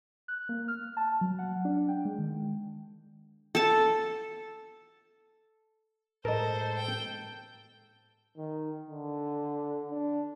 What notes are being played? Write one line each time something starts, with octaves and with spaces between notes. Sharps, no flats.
F#6
A#3
F6
A5
F#3
F#5
D4
G5
G#3
D#3
A4 A5
A2 G#3 A4 A#4 C5 D#5
G5
D#3
D3
D4